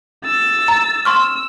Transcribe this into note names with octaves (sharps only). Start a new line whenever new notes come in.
E6 A6
A#5
C6 C#6 E6 F6